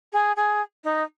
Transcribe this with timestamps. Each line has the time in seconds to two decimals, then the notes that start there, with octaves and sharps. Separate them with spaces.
0.13 G#4
0.36 G#4
0.84 D#4